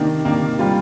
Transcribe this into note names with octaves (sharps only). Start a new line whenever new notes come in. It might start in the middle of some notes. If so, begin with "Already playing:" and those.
Already playing: C3 D#3 A#3 D4
C3 D#3 A#3 D4
G3 C4 F4